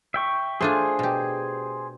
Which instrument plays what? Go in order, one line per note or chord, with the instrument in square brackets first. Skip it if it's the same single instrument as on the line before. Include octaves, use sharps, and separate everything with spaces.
[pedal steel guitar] E5 G5 C#6
[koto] A3 D4 F4 [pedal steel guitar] G#4 C5 G#5
[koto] B2 G4